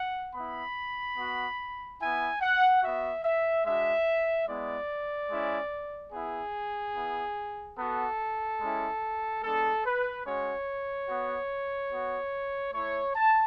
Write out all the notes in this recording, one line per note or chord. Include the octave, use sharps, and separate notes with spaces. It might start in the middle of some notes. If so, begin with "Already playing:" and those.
Already playing: F#5
B3 E4 B5
B3 F#4
B3 E4 G#5
F#5
B3 F#4 E5
E5
G#3 D4 F#4 E5
G#3 B3 E4 D5
G#3 C#4 E4
B3 E4 G#4
B3 E4
B3 F#4 A4
G#3 C#4 E4
G#3 B3 D4 A4
B4
G#3 C#4 F#4 C#5
B3 F#4
B3 F#4
A3 E4 C#5
A5